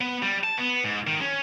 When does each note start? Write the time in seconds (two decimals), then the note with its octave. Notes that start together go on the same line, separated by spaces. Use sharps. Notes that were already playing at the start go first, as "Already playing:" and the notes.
0.01 B3
0.22 G3
0.44 A5
0.58 B3
0.84 G#2
1.07 D#3
1.21 C#4